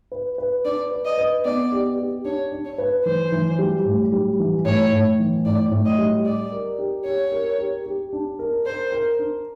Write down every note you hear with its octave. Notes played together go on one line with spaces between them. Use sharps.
B4
B4
D4 D5
B4
D#5
B4
B3 D5
G4
G4
D4 C#5
D4
C#5
B4
E3 C5
E3
G3
A2
G3
E3
A2 C#5
A2
E3
A2 D5
A2
D#5
G3
G4 D5
A#4
G4
G4 C#5
A#4
G4
G4
D4
A#4
A#4 C5
A#4
D4